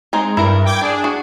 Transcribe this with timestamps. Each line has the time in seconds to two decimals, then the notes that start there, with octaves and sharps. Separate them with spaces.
0.13 G#3 C4 D#4 G#4
0.37 G2 E4 A#4
0.65 G5 D6 G#6
0.81 D4 G#4 D5
1.04 F#4